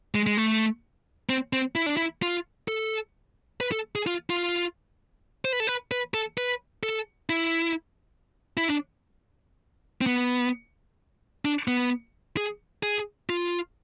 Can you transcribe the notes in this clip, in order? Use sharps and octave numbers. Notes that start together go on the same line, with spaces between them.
G#3
G#3
A3
C4
C4
E4
D4
E4
F4
A4
B4
A4
G#4
F4
F4
C5
B4
A4
B4
B4
A4
B4
A4
E4
E4
D4
C4
B3
D4
B3
G#4
G#4
F4